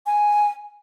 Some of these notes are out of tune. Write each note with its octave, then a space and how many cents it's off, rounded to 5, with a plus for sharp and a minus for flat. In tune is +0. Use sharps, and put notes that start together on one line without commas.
G#5 +0